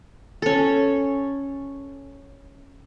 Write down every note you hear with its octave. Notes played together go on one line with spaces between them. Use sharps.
C#4 A4